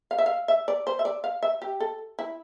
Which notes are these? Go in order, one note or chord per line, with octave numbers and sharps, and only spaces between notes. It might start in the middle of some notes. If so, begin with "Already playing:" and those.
F5
E5
F5
E5
D5
C5
E5
D5
F5
E5
G4
A4
E4